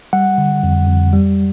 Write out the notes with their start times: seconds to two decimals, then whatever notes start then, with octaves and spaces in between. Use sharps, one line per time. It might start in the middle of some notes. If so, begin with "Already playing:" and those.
0.13 G3 F#5
0.38 D3
0.63 F2
0.88 F2
1.13 G3